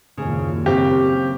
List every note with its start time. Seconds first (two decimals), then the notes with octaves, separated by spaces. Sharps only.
0.17 F#1 D#2 A#2 C#3
0.66 C#3 A#3 C4 G4